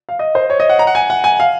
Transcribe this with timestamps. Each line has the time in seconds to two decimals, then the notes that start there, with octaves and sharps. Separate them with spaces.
0.09 F5
0.19 D#5
0.35 C5
0.50 C#5
0.60 D#5
0.70 F#5
0.79 A#5
0.87 F#5
0.95 G#5
1.10 F#5
1.24 G#5
1.40 F5